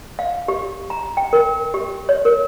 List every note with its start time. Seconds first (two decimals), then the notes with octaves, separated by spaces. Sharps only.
0.19 F5
0.48 G4
0.90 A#5
1.17 G5
1.33 A#4
1.74 G4
2.09 C#5
2.25 A#4